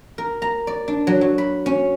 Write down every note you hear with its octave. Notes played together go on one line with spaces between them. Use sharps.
A#4
A#5
D5
D4
F#3
F#3
B5
C#4